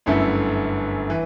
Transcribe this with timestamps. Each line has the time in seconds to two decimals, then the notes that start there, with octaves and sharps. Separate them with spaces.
0.06 G1 F#2 D3 A3 E4
1.10 E3